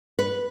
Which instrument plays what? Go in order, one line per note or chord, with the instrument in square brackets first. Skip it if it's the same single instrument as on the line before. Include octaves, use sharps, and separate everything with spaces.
[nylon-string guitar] B4